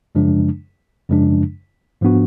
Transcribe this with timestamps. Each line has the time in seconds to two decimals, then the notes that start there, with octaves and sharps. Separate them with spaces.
0.15 F#2 C#3 F3 G#3 D4
1.09 F#2 C#3 F3 G#3 D4
2.01 G#2 F3 B3 D4 F#4